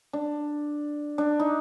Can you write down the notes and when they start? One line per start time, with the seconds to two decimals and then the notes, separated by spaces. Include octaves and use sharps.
0.13 D4
1.18 D4
1.40 D#4